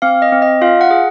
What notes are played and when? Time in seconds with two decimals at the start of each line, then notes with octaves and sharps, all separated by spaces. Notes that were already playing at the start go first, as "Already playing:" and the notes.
0.02 C4 F5
0.22 D#5
0.32 C4
0.42 D#5
0.62 F4 F5
0.81 F#5
0.91 G#4